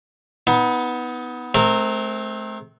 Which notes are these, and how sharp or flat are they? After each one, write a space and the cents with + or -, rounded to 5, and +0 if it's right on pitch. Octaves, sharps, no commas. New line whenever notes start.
B3 +0 D#4 +25
A3 -40 C4 +0 A#4 -15